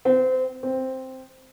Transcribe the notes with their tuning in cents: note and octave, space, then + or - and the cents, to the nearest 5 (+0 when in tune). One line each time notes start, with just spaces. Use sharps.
C4 -25
C4 +0